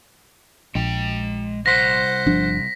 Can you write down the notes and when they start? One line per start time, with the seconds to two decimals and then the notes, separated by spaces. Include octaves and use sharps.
0.75 A#1 G#3 G5
1.66 C2 C5 F#5 C6 A#6 B6
2.26 G1 F3 D4